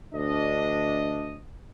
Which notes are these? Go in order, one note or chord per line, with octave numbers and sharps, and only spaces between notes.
D2 D4 D#5